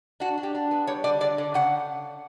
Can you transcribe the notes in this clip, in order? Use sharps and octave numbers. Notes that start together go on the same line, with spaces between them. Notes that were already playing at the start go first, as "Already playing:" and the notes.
D4 F#4
D4
G4
D4
B3
G3 C#5
D3 D5
D3 D5
D3
C#3 F#5